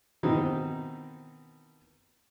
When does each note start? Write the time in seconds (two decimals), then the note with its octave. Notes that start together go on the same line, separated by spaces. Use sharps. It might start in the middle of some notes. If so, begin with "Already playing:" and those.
0.23 B2 D#3 E3 C4 D#4 E4